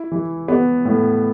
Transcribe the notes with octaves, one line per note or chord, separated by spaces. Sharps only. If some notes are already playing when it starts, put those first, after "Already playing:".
Already playing: E4
E3
B3
A2